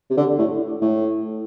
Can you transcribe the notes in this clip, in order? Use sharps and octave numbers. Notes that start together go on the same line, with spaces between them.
C3
D3
A2
A2